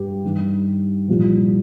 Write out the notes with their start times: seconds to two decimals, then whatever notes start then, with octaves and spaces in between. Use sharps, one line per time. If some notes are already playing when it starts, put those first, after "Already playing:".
Already playing: G2 G4
0.24 G2 D#3
1.08 C2 A#2 F3